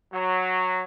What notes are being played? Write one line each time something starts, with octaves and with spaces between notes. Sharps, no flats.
F#3